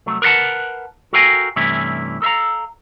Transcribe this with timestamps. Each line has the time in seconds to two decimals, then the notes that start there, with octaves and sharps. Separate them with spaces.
0.06 C2 F#3 A3
0.22 A#4 B4 D5 F#5 A5
1.13 F#4 A4 A#4 F5 G5 G#5
1.56 G2 C3 E3 A3 C#4 E4
2.22 A4 A#4 E5 F5 A#5